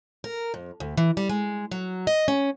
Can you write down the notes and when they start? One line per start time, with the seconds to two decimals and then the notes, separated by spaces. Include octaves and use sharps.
0.24 A#4
0.54 F2
0.80 D2
0.97 E3
1.17 G3
1.29 G#3
1.71 F#3
2.07 D#5
2.28 C#4